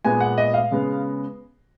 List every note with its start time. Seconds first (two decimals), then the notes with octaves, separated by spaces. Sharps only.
0.05 A#2 G#3 B3 G#5
0.20 F#5
0.38 D#5
0.54 F5
0.71 C#3 G#3 B3